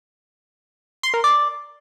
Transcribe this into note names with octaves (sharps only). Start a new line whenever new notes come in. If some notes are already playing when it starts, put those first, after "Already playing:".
C6
A#4
D5